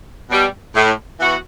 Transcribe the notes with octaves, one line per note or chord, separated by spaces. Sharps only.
B2 G3
A2
E3 B3 F#4